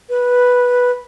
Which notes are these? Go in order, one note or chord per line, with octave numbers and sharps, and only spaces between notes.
B4